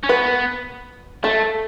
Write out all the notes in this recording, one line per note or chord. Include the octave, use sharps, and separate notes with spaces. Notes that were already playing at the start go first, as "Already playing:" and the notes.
C#4
B3 B4
A3 A4